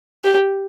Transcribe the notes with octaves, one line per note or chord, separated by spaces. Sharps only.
G4